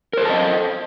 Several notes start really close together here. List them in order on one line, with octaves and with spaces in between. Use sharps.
A#4 C5 A4 A5 D#5